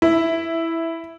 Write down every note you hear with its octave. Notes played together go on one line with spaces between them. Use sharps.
E4